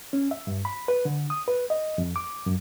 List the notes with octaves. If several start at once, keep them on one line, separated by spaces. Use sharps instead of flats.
C#4
E5
G2
B5
B4
D3
D#6
B4
D#5
F2
D6
F#2